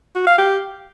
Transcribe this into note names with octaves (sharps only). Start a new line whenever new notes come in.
F#4
F5
G4